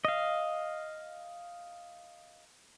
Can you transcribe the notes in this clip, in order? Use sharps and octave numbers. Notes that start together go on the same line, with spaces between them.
D#5 F5